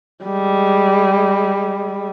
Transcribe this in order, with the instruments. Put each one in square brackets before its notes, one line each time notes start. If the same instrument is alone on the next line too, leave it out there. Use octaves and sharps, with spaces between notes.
[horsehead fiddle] G3 G#3